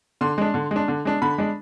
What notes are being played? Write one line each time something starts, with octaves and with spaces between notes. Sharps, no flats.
D3 C6
G#3 D4
D3
G#3 D4
D3
G#3 D4
D3 B5
G#3 D4